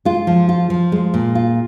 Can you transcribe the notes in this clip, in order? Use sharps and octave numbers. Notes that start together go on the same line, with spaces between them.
G#3 F4
F3
F4
F3
G#3
A#2
F4